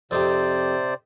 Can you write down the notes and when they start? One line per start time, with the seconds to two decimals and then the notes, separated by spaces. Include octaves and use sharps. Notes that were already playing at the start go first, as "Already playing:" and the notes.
0.11 F2 C3 D#4 G4 C5 D5